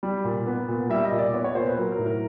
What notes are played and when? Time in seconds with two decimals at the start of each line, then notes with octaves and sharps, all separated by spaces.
0.03 G3
0.24 A#2
0.46 B3
0.68 A#2
0.90 G3 E5
1.05 D#5
1.12 A#2
1.19 D5
1.33 B3 C#5
1.44 C#5
1.55 A#2 C5
1.67 B4
1.77 F#3 A#4
1.92 A#4
1.99 A2
2.06 A#4